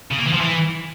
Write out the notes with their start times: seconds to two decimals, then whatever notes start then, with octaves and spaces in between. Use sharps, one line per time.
0.11 C#3
0.18 A#3
0.26 E3
0.33 F3
0.41 E3